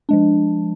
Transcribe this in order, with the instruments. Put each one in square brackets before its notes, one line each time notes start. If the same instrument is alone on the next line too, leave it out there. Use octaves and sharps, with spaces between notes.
[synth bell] F3 G#3 D4